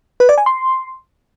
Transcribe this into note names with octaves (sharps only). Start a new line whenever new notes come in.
B4
D5
G#5
C6